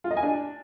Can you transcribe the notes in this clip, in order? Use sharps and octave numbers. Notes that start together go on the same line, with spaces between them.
F4
D#5
G#5
D4